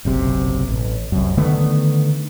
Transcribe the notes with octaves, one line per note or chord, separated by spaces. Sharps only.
F#1 B1 C3
A1
C2 F#2
D3 D#3 A3 B3